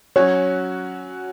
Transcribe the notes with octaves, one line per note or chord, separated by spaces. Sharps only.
F#3 C#4 F#4 C#5